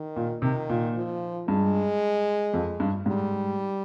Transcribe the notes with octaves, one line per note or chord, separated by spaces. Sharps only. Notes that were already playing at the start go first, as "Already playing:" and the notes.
Already playing: D#3
A#2
C3 D#3
A#2
F3
G2 G#3
F2
G2
G#2 G3